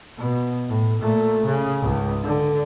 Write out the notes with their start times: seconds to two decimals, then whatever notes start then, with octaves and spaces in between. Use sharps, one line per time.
0.17 B2
0.69 A2
1.01 A#2 A3
1.45 C#3
1.81 C#2 G#2
2.23 D3